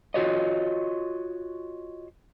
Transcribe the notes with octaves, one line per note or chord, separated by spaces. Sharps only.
F4 F#4 C#5 D#5